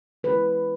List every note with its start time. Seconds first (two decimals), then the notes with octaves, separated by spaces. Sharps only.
0.24 E3 G#3 C#4 E4 B4